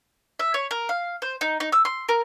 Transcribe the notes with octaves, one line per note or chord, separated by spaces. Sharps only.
E5
C#5
A#4
F5
C5
D#4
D#4
E6
C6
A#4